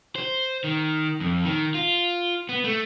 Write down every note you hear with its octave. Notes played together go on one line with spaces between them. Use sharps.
C5
D#3
F2
D#3
F4
B3
A3